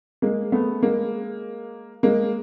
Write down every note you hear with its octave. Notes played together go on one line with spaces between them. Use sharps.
G#3 A#3
A3 B3
G#3 A#3
G#3 A#3